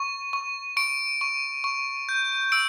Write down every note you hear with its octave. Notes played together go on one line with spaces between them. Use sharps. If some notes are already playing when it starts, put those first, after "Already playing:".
Already playing: C#6
C#6
C#6 D7
C#6
C#6
G6
E6 D7